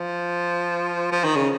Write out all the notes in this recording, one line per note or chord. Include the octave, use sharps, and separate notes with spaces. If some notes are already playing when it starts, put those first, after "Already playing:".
Already playing: F3
F3
D#3
C#3